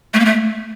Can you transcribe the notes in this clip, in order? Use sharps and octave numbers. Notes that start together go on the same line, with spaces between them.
A3
A#3
A3